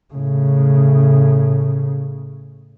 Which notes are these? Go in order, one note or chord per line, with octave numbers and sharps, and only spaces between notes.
A2 C#3